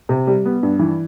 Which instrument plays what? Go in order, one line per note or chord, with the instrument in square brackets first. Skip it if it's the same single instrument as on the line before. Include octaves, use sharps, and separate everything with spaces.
[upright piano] C3
G3
B3
G2
E3